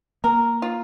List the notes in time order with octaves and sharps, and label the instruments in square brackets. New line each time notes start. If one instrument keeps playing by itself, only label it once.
[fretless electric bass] A#3 [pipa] A#4
[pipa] F4